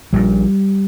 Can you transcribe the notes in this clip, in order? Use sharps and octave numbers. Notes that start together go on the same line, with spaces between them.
A#1 A#2 G3